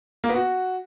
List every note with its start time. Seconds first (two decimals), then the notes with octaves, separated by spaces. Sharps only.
0.24 A#3
0.29 B3
0.35 F#4